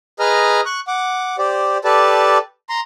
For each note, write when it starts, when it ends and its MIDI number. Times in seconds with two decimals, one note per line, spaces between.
0.20 0.61 68
0.20 0.61 71
0.20 0.61 75
0.20 0.61 82
0.20 0.61 89
0.65 0.80 85
0.65 0.80 90
0.88 1.36 78
0.88 1.36 86
1.38 1.78 67
1.38 1.78 72
1.38 1.78 74
1.84 2.38 67
1.84 2.38 69
1.84 2.38 71
1.84 2.38 74
1.84 2.38 81
2.69 2.81 82
2.69 2.81 84